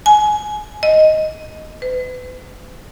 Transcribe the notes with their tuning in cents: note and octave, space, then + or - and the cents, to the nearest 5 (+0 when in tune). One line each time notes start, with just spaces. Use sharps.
G#5 +25
D#5 +5
B4 +40